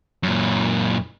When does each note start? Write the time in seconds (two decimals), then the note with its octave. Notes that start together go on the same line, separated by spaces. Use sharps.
0.23 F#2 A#2